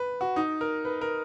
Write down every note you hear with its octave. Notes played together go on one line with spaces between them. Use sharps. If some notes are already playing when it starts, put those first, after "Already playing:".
Already playing: B4
F#4
D#4
A#4
B4
A#4